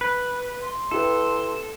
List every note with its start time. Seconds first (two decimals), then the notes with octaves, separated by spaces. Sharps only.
0.01 B4
0.63 C6
0.91 E4 G4 A4 B4